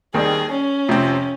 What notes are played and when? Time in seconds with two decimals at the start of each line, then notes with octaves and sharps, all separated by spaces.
0.14 D#2 D#3 G3 C4 D#4 G#4
0.51 C#4
0.89 F2 C3 F3 C4